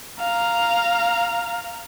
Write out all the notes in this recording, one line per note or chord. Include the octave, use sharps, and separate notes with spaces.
F5 A#5